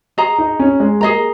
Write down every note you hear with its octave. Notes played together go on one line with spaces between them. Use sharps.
G#4 D#5 A#5
D#4
C#4
G#3
A#3 G#4 D#5 A#5